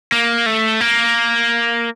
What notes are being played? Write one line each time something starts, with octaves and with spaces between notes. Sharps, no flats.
A#3
A3
A#3